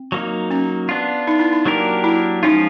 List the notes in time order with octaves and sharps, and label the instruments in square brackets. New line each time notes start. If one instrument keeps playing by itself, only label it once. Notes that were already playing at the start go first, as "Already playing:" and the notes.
Already playing: [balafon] C4
[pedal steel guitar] F#3 A#3 D#4
[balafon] C#4
[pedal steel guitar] B3 D4 F4
[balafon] D#4
E4
D#4
[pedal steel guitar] F#3 A#3 D4 G4 A#4
[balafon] E4
[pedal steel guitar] F3 G#3 C#4 F4 [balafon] D#4